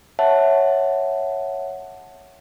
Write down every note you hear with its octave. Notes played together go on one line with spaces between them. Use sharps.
C#5 E5 F#5 A5